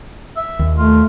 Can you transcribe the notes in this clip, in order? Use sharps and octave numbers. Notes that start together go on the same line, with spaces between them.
E5
D#2
A3 F4